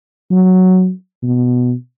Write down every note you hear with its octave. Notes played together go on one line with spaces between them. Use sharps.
F#3
B2